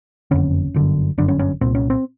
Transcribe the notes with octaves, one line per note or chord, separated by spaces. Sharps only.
F#1 F2 D3 C#4
G1 F#2 D3
G1 F#2 D3 D4
C#4
C#4
C2 A#2 C4
C#4
C4